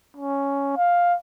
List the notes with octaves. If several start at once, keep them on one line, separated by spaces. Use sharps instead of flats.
C#4
F5